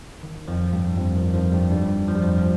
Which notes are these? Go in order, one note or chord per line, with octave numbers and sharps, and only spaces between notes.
D#3
F2 F3
G2 G3
F2 F3
D#3
F2 F3
G2 G3
G2 G3
F3
G3
F2 F3
F3